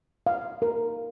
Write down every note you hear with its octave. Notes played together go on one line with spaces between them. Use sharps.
F5
A#4